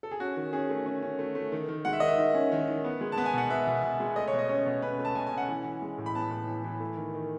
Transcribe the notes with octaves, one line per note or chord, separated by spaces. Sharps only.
A4
G#4
C#4 F#4
D#3
C#4 G#4
A3
C#4
C#4
A3
A3
D#3
D#3
G#3 F#5
E5
D#3 D#5
E5
D#3
C#4
D#3
D#3
B3
G#3
A5
B3
G#5
B2 F#5
B3 E5
B2
B2
G#3
A3 D#5
C#5
B2
D#5
C#4 C#5
B2
C#4 B4
A3
A5
B2 G#5
G#5
C#4
F#5
E3
E3
G#3
A2
B5
B3 A5
A2
E3
E3
A3
D#3
D#3